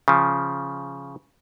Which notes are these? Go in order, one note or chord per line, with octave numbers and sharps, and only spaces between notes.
C#3 F3